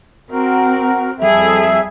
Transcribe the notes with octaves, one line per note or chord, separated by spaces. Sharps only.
C4 F#4 A#4
F2 G3 G#4 A4 E5